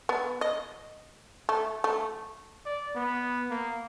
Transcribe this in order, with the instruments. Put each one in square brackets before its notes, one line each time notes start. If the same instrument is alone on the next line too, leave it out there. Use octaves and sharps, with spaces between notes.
[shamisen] B3
D#5
A3
A3
[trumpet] D5
B3
A#3